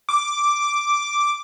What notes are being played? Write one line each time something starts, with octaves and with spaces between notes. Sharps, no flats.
D6